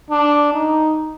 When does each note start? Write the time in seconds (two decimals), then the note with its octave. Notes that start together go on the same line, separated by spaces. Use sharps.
0.10 D4
0.53 D#4